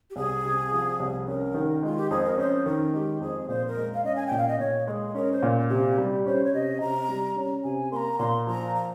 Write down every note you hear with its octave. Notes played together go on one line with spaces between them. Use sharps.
G4
C2 G#4
C3
F3
C2
C#4 A#4
D#3
G#3 F4
G4
F2 G#4
A#4
C#4 C5
D#3 A#4
G#3 G4
F2 G#4
A#2 C5
A#4
G#3
F5
C#4 D#5
G#5
A#2 G5
F5
D#5
A#2 C#5
G#3 G#4 A#4
C#4 A#4
C5
A#2
C3 G4
G3
C#4 C5
C#5
C3 D#5
C3 A#5
G3
C#4
C3 G#5
A#3 A#5 C6
A#2 C6
F3 A#5
A#5